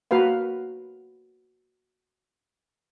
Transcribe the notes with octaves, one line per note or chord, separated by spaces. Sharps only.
A#3 F#4 A#4 B4 F5